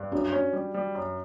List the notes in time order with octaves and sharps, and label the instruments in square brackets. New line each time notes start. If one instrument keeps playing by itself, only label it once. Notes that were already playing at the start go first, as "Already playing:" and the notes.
Already playing: [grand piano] G2
[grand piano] F#2 [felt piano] D4 F#4
[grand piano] C#4
G3
G3
F#2